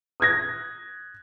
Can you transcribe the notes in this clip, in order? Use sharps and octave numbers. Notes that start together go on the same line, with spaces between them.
D#6 F#6 G#6 A#6